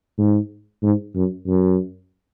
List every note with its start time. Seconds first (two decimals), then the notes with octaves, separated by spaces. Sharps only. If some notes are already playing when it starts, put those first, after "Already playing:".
0.18 G#2
0.82 G#2
1.15 F#2
1.47 F#2